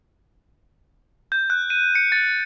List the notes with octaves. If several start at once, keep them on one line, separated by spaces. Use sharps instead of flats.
G6
F#6
D#7
C#7
A6